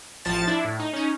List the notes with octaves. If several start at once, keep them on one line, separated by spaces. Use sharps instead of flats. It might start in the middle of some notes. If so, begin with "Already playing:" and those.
A1 F3 A5 A6
D4 E4
A2
D#4
C#4 D#4